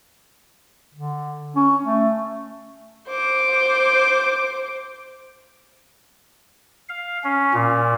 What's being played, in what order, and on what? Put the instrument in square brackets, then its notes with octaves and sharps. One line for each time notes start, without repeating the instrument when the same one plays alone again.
[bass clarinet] D3
C#4
A3
[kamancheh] C5 D6
[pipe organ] F5
C#4
A#2